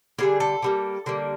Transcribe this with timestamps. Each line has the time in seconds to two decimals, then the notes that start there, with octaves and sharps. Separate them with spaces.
0.18 D3 G3 A#3 G#4
0.40 A4
0.62 D3 G3 A#3
1.06 D3 G3 A#3